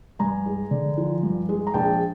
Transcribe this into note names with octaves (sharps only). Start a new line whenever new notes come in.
G2 G#5 A#5
G#3
D3
F3
G2
G#3
A#5
A#1 G5 A5